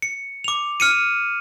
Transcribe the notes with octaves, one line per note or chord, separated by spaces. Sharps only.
C#7
D6 F7
F6 C#7 D#7